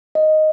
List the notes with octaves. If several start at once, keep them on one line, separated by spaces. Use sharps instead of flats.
D#5